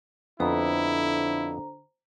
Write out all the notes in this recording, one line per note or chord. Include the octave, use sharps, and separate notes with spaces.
F2 D3 B3 E4 C5 A#5